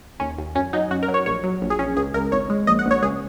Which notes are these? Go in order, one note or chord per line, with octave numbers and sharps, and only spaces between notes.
D#2 C#4
D#2
F#2 C#4
F#3 D#4
F#2 F#4
A#4
F#3
C#5
A#1 C#5
F#3
A#1
G#4
A#1 C#4
C#2 G#4
C#2 A#4
G#1 C#5
G#3
A#1 D#5
F#5
A#1
C#5
C#2 G#4